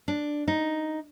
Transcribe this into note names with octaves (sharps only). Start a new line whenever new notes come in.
D4
D#4